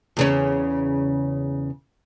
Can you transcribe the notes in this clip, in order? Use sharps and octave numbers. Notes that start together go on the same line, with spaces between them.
E2 C#3 C#4